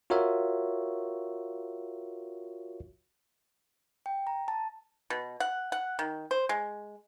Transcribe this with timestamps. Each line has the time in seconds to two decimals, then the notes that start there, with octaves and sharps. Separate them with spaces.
0.10 F4 F#4 A#4 C#5 E5
4.06 G5
4.27 A#5
4.48 A5
5.10 B2
5.40 F#5
5.72 F#5
5.99 D#3
6.31 C5
6.49 G#3